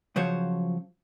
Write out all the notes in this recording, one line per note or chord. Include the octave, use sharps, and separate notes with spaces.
C#3 F3 F#3 C5 C#5